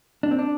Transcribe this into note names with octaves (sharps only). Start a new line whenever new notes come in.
D4
C4
D4